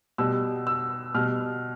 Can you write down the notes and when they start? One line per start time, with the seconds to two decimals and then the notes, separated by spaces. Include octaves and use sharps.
0.18 B2 G3 E6
0.67 E6
1.15 B2 G3 F6